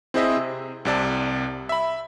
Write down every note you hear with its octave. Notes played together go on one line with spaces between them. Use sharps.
C4 E4 G#4 C5 D#5 E5
C3
C2 C3 D5 A5
E5 B5